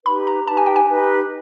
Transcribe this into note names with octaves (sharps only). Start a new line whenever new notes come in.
D#4 G4 B4 B5
A#5
D#4 G4 B4 A5
G#5
G5
G#5
D#4 G4 B4